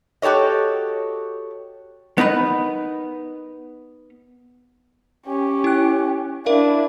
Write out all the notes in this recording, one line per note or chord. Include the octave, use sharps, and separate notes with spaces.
F#4 G4 A4 C#5 D#5
B3 D#4 A#4 B4
C#4 G4
E4 F#6
D4 E4 A#4 F5